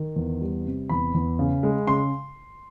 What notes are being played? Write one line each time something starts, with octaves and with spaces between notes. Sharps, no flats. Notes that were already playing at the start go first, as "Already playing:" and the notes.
Already playing: D#3
E2
G3
C3
E2 B5
E2
C#3
G#3
C#3 C6